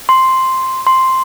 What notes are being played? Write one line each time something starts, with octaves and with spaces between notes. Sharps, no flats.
C6
C6